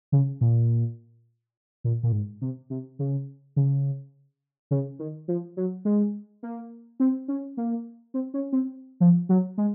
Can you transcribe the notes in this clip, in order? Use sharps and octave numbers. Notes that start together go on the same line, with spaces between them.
C#3
A#2
A#2
A#2
G#2
C3
C3
C#3
C#3
C#3
D#3
F3
F#3
G#3
A#3
C4
C#4
A#3
C4
C#4
C4
F3
F#3
G#3